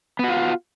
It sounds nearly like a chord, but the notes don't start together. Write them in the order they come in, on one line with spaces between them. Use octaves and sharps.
B3 F#4 F4